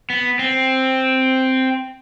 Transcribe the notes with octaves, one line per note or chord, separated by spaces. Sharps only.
B3
C4